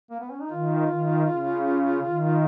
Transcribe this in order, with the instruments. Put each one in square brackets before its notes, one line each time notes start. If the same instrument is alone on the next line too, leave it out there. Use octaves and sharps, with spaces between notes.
[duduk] A#3
B3
C#4
D#4
[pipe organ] D#3 [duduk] F4
[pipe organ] D#3
C#3
D#3